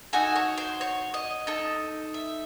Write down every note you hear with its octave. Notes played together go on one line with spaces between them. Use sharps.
D#4 F#4 A4 G#5
C#5
C5
C#5
D#5
D#4 A4
E5